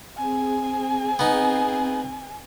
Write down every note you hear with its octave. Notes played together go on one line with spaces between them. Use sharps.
C4 G#4 G#5
B3 D#4